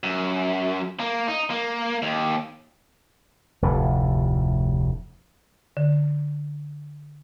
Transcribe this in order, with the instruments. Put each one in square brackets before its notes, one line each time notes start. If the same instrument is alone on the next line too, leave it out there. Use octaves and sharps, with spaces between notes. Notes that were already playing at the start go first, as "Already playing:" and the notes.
[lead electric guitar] F#2
A#3
D#4
A#3
D#2
[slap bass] F1 D2 A2
[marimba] D3